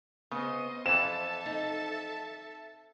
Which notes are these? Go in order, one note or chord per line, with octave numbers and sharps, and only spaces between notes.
C#3 B3 C5 D#5
F2 E3 C4 A4 E5 A5 E7
D#4